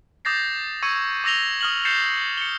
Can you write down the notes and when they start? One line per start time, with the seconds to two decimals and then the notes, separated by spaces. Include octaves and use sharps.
0.25 D6 D#6 G6 A6 A#6 C7
0.83 C#6 E6 G#6 C#7 D#7
1.24 D6 E6 A#6 F7 G7
1.61 D#6 F6 F#7
1.85 G6 A6 C7 C#7 E7
2.37 C#7 G7